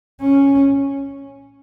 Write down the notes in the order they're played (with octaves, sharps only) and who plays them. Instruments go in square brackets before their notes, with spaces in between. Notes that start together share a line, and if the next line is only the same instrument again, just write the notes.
[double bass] C#4